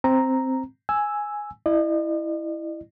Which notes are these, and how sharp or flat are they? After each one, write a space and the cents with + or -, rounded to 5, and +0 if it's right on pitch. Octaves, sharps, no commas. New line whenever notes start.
C4 +0 A#5 +0
G#5 +0 E6 +0
E4 +0 D#5 -45